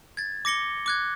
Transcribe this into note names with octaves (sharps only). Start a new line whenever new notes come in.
G#6 A6
D6 A#6 C#7 G7
D6 F#6 G#6